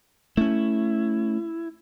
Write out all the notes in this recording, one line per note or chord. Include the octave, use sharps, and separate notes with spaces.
A3 C#4 E4